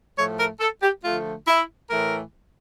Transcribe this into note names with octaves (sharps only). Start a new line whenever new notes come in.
A2 F3 A3 C#5
A#4
A4
G4
D3 F3 A3 F4
E4
A2 E3 A3 A#4